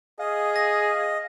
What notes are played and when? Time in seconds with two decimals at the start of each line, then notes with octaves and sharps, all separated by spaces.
0.19 G#4 D#5 F5
0.56 A#6